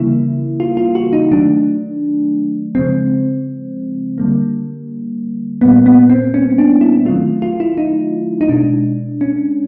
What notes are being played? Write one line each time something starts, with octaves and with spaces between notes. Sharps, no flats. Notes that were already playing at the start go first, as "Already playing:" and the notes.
Already playing: C#3 E3 G3 A#3 E4
F4
F4
F#4
D#4
D#3 F#3 A3 D4
C#3 F3 G#3 C4
D3 G3 A#3
A#2 G3 A#3 B3
B3
C4
C#4
D4
E4
D#3 F#3 A3 F4
F4
E4
D#4
D#4
B2 G#3 D4
C#4